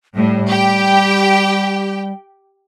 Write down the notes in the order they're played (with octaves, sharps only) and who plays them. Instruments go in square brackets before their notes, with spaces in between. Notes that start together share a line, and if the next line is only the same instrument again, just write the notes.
[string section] A2 [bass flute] G3
[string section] G4 G5